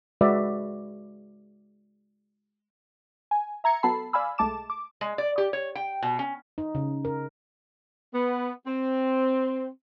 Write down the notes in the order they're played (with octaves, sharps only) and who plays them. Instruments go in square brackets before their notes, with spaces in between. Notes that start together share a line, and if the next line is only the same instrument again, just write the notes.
[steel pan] G#3 F#4 B4 D5 E5
[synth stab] G#5
E5 A#5 G#6 C#7
F#3 B3 A4 A5 B5 C7
D5 F5 G#5 B5 E6
B1 G#3 A3 A5 D6 E7
D6
[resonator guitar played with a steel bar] G#3
D5
G4
C#5
G5
B2
C#4
[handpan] D#4
C#3
A#4
[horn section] B3
C4